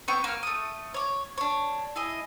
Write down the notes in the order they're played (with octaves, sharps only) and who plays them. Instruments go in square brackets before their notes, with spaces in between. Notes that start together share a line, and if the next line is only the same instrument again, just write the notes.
[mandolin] B3 C4 G5 C#6
A#3 F6
A3 D#6
C#5 D6
D4 C#5
E4 G#4 D#5